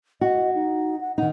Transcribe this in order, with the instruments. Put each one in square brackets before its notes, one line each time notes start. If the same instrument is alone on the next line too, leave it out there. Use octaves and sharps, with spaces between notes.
[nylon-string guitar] F#4 [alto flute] D#5
[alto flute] D#4
F#5
[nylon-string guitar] D#3 D#4 [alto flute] F#5